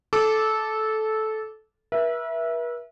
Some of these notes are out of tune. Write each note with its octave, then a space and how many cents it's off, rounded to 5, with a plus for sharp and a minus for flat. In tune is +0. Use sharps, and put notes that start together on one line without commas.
A4 -15 D6 +0
B4 -45 E5 +0